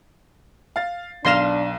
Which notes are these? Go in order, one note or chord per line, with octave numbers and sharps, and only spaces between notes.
F5 A6
B1 D4 F5 C6 A#6 E7